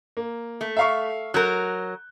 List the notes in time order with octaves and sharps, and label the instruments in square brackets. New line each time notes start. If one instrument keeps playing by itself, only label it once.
[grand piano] A#3
[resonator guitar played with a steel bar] A3
[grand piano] E5 F5 C#6
[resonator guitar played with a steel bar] F#3 A#4 [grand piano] F#6 G6